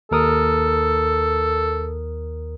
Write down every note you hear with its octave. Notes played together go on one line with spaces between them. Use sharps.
D#2 A4 A#4 D#6